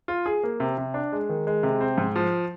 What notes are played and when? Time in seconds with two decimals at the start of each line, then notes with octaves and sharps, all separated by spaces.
0.08 F4
0.26 G#4
0.43 A#3
0.60 C3
0.78 C3
0.94 D4
1.12 G#3
1.29 D#3
1.47 G#3
1.63 C3
1.81 C4
1.98 G#2
2.16 F3